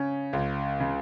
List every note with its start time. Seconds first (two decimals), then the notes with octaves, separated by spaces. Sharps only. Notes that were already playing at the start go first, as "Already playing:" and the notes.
Already playing: C#3 C#4
0.33 C#2
0.80 C#3